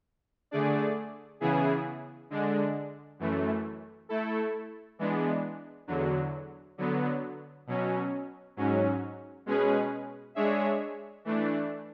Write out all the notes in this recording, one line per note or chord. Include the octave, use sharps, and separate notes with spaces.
D3 A3 D4 G#4 D5
C#3 E3 B3 E4 G#4
D3 G#3 D4
F#2 E3 A3
A3 E4 A4
E3 G#3 B3 D4
E2 D3 F#3
D3 F#3 B3
B2 F#3 C#4
G#2 F#3 C#4
B2 G#3 C#4 G#4 B4
G#3 D4 G#4 C#5 E5
E3 A3 D4